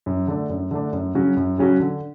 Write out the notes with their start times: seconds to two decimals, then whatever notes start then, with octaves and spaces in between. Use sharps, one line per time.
0.06 F#2
0.27 D3 A3 D4
0.49 F#2
0.71 D3 A3 D4
0.93 F#2
1.15 C#3 F#3 C#4 F#4
1.36 F#2
1.58 C#3 F#3 C#4 F#4
1.80 D3